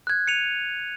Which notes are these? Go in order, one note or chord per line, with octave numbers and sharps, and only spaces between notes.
F#6 G#6
C#7 D#7 F7